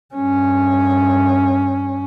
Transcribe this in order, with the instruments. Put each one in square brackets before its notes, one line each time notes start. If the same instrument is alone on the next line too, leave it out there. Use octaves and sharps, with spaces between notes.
[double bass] G2 C#4